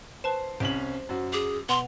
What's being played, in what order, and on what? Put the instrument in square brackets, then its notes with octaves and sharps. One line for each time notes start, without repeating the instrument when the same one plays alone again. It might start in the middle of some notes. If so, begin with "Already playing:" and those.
[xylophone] B4 A5 E7 [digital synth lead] C5
[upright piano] C2 C#4 F#7 [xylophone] D7
[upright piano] F#2 F#4
[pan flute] G#4 [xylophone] D6
[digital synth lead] B2 [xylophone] F#5 F7 [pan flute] C6